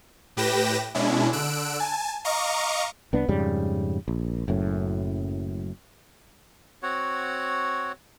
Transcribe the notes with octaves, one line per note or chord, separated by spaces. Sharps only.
A2 G4 B4 G5 A#6 E7
B2 G#3 C#4 D4 E4
D3 E6 F#6 D7
G#5 A5
D#5 F5 A#5 C#6 D6
C2 B3 D4
F2 G#2 C#3 G3
A#1
F#1 F#2 A2
C4 F#4 C#5 F#5